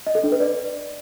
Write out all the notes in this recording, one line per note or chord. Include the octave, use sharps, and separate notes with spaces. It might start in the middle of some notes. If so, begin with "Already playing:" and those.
D#5
A4
D4
B4
D5